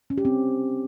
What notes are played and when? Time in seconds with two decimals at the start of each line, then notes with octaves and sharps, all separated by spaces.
0.10 C#4
0.18 G4
0.25 C4